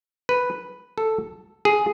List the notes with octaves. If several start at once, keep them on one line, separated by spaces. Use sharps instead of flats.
B4
A4
G#4